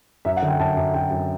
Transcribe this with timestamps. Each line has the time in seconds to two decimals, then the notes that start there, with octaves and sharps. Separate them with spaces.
0.25 F#2 E5
0.37 F#5
0.42 D3
0.48 G5
0.59 F#2 A5
0.77 F#2
0.94 F#2 G5
1.11 F#2